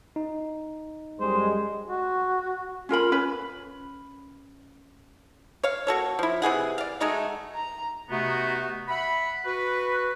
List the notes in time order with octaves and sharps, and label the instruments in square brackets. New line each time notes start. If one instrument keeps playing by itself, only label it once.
[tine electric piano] D#4
[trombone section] F#2 G3 G#3 [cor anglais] C5
[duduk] F#4
[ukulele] C#4 F4 A#4 B5
C#4 B4 B5
[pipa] C#5 F5
A#3 F#4 A4 C#5
F3 E4
C3 E3 G#4 F#5
D5 F5
G#3 A3 D#4 F#4
[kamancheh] A#5
[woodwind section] C3 A3 B3 D#4 F#4
E5 F#5 B5
F#4 B4